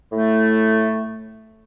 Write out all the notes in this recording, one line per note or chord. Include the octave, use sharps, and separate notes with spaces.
A2 A3